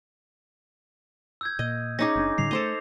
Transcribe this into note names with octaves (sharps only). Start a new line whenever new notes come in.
E6 G6 G#6
A#2 D#5
C#4 D#4 G#4 D6 A#6
F#1 A2 D4
A2 D3 G3 C7 F7
A3 A4 C5 D#5